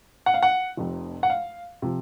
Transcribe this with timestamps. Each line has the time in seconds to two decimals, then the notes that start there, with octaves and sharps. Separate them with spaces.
0.26 F#5
0.34 F5
0.42 F#5
0.77 F1 F2 C3
1.23 F#5
1.30 F5
1.82 C3 F3